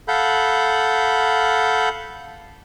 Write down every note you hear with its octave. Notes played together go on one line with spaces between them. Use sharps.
A4 F5 F#5 B5 G6